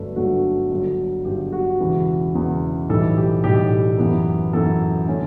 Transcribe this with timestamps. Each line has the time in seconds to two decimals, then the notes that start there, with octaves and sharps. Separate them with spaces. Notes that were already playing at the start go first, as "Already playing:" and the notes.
Already playing: G1 G2 F#3 A3 D4 B4
0.16 G1 G2 F#3 A3 D4 F#4
0.71 G1 G2 F#3
1.25 G1 G2 F#3 G4
1.53 F#4
1.80 E1 E2 C#3 E3
2.35 E1 E2 C#3 E3
2.89 B1 A2 E3 G3 A4
3.17 G4
3.44 B1 A2 E3 G3 G4
3.99 F#2 E3 B3
4.53 F#2 E3 B3 A4
5.08 D3 A3 C#4